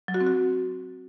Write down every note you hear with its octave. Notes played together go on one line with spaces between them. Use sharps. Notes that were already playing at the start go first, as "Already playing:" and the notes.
F#3
F#4
C4
F#4